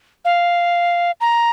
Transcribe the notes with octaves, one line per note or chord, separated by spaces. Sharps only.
F5
A#5